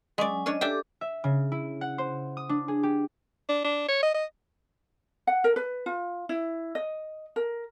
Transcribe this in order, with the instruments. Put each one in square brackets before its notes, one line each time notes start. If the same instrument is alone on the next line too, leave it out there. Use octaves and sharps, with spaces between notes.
[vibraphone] F#3 C#4 G#5 [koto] G#3 D5
[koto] C#4 D4 C#5 [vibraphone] D#5
[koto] D4 E5 G5 [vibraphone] G4 A4 D6
[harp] E5
C#3
E4
F#5
C5
D#6
D4
G#4
G4
[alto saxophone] D4
D4
C#5
D#5
D#5
[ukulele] F#5
A#4
B4
F4
E4
D#5
A#4